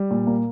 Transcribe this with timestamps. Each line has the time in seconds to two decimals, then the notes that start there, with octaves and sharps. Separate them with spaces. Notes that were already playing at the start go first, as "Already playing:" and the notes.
Already playing: G3
0.11 A#2
0.27 A#3